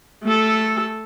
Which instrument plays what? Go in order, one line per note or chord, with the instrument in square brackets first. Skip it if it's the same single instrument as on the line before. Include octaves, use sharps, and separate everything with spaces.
[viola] A3 A4